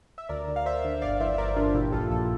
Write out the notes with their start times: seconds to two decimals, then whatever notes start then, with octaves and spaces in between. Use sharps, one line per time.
0.18 E5
0.29 D2 A#4 D5
0.47 D2
0.56 F5
0.66 D2 C5 E5
0.85 D3
1.01 G1 D5 F5
1.15 F5
1.20 E3 C5 E5
1.34 E5
1.38 G1 A#4 D5
1.56 G2 D4 F4
1.74 A#2 E4 G4
1.92 A#1 F4 A4
2.10 A#1 F4 A4